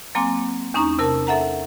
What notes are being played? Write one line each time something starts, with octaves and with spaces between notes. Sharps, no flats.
F#3 A#3 C4 G#5 C6 D6
E2 C#4 D#4 A#5 C#6
C3 A#4 A5
A4 E5 F#5 A#5